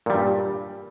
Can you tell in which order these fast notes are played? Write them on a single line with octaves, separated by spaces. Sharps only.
A#2 G3 G2